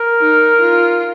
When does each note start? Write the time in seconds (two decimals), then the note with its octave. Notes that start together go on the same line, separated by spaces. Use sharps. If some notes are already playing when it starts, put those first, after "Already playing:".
Already playing: A#4
0.21 D#4
0.61 F4